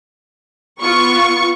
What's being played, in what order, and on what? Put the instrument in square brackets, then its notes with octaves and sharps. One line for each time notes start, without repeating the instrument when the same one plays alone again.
[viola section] B3 F4 [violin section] C#6